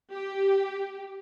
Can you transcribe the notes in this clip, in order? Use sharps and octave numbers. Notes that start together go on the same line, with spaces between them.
G4